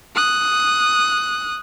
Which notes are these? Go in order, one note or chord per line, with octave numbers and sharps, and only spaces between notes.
D#6 F#6